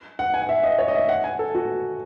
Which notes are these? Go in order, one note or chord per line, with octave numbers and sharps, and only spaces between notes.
F#5
G#5
F#5
E5
D#5
C#5
D#5
E5
F#5
G#5
A4
F#4